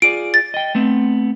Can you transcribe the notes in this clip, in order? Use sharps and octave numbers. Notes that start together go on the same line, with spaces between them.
F4 G#4 D5 D7
A6
D#5 G5
A3 B3 C4